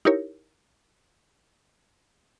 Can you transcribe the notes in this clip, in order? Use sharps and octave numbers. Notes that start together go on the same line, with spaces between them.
D#4 E4 G4 A#4 C#5